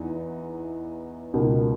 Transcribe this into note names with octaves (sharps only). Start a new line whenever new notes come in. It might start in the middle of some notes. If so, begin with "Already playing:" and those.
Already playing: E2 E3 B3 D#4
C#2 B2 A#3 D#4 A#4